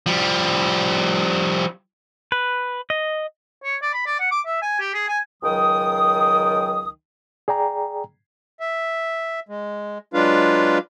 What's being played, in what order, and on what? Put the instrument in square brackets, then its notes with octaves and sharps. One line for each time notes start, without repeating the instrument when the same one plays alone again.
[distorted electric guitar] F3 G3
[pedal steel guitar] B4
D#5
[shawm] C#5
D5
B5
D5
F#5
D6
E5
G#5
G4
G#4
G#5
[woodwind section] C#2 D#3 F#3 G5 D#6
[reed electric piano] G#4 D5 G5 A#5
[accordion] E5
G#3
F#3 G#3 D4 F4 B4 F5